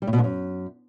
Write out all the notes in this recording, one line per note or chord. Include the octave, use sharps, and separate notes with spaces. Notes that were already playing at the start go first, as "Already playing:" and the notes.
G3
A2
B2
G#2
F#2